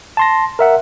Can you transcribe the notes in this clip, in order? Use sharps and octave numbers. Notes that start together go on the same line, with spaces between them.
A5 C6 A#6
A#4 E5 F#5